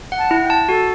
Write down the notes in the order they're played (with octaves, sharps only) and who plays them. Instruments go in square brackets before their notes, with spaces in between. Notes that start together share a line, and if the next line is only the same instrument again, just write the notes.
[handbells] F#5
[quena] A5
[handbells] E4
[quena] G5
[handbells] A5
[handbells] F#4 [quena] A4